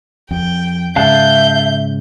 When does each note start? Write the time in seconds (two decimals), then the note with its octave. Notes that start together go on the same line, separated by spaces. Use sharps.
0.31 F2 G5
0.96 G#2 C#3 E5 F5 A5 F#6 G6